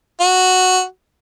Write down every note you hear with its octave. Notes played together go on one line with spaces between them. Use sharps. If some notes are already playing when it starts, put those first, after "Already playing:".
F#4